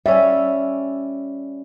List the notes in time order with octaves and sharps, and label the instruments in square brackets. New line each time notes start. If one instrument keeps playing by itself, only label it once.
[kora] G3 C#4 [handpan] E5